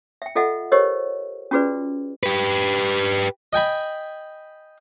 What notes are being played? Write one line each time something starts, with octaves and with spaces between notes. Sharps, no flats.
E5 G5
F4 A4 D#5 E5 F#5
G4 A#4 C5 C#5 D#5
C#4 F4 F#4 G#4 B4 D5
G4 B4
D#5 G5 G#5 B5